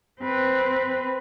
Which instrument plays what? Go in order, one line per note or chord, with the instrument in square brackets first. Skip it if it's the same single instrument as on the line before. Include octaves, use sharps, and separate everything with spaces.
[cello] C4 B4